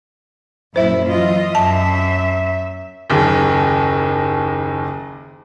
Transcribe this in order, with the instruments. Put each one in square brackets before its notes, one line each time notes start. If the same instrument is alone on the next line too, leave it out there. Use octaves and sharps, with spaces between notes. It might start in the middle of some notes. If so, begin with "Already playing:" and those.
[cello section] F#2 A#2 F#3 [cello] E4 [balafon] C5 E5
[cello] E3 D#5 [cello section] F#3 F4
[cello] F#2 [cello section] E5 [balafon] A5
[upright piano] F#1 D#2